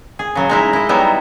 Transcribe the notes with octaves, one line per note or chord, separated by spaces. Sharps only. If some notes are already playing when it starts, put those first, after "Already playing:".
G#4
C#3 F#3
G#3 D#4 E4
E4 D#5
F#3 G3 B3 D#4 E4